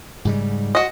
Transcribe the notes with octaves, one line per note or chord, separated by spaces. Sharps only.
G#2 C#3 G3
F#4 D#5